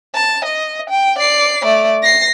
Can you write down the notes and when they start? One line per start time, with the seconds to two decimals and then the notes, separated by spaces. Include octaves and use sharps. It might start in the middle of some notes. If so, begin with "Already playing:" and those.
0.15 A5
0.45 D#5
0.90 G5
1.19 D5 C7
1.65 A3 D5
2.03 A#6 C7